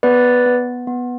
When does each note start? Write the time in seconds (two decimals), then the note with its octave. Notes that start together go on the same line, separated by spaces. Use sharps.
0.03 B3 B4 D5
0.46 B3
0.87 B3